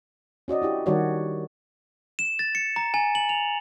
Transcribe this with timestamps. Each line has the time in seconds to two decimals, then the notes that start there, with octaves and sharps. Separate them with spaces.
0.48 C#4 F#4 D5 D#5
0.62 D4 E4 G4
0.86 D#3 G3 D4 F#4 C#5 D5
2.19 E7
2.39 A6
2.55 C#7
2.76 A#5
2.94 G#5
3.15 F#7
3.29 F7